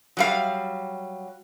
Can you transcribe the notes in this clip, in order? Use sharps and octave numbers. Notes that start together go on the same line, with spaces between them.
F#3 G3 F5